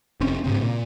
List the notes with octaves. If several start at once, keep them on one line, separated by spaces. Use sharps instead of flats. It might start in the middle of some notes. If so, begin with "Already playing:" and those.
F1 C4 C#4
G#2 C#3 C4
A#2